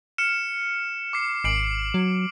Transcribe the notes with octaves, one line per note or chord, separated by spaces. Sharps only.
F6 C#7 E7
D6 C7
G#1 C7 D7 F#7
F#3